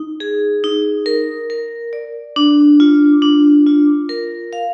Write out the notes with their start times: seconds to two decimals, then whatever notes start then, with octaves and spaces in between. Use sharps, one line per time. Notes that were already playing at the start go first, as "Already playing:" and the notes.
Already playing: D#4
0.20 G#4
0.64 D#4
1.06 A#4
1.50 A#4
1.93 D5
2.36 D4
2.80 F4
3.22 D4
3.66 F4
4.09 A#4
4.53 F5